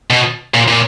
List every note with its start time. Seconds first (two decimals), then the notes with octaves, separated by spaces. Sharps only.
0.10 B2
0.54 A#2
0.68 A#2